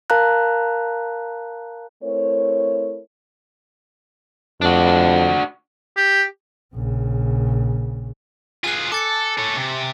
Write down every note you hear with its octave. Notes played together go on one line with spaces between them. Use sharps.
A#4 F5 A5 A#5 F#6
A3 C4 E4 A#4 C#5
F2 D4 F#4
G4
A#1 C#3
F4 G#4 G#5 F#6
A4 D6 A6 C#7
A4 C#5
C3